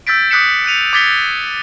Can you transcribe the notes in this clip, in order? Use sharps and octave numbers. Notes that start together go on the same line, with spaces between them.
E6 G6 A6 B6 D7
D6 D#6 F#6 B6 C#7 E7
F#6 C#7 D#7 F7
D6 G#6 A6 B6 C#7 G7